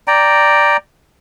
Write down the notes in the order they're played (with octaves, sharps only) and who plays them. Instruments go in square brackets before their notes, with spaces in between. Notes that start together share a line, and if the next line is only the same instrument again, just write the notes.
[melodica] D5 G5 A#5